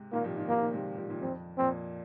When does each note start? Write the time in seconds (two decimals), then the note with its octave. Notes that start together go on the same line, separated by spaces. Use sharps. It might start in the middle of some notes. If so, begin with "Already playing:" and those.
Already playing: G#2 C3
0.12 A#2 D#3 A#3
0.24 C3 F3
0.37 A#2 D#3
0.48 C3 F3 A#3
0.61 A#2 D#3
0.73 G#2 C3
0.97 C3 F3
1.09 A#2 D#3
1.22 F2 C4
1.58 F2 A#2 C4